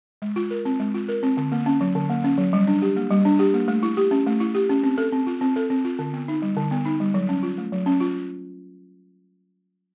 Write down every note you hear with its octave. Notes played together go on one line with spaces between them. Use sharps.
G#3
F4
A#4
C4
G#3
F4
A#4
C4
D3
A#3
C#4
F#3
D3
A#3
C#4
F#3
G3
D4
G4
A#3
G3
D4
G4
A#3
A3
E4
G4
C#4
A3
E4
G4
C#4
C4
A4
C4
F4
C4
A4
C4
F4
D3
B3
D#4
G3
D3
B3
D#4
G3
F#3
C#4
F4
A3
F#3
C#4
F4